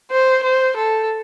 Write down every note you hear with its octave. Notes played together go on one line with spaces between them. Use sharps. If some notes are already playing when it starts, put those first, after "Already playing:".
C5
C5
A4